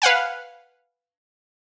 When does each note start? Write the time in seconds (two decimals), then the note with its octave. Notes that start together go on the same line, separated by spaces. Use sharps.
0.02 B4 F5 F#5 G#5